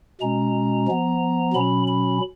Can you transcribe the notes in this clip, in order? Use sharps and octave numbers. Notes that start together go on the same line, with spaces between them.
B2 G#3 C#4 A#5
F3 B3
B2 F#3 C#4 B5
B5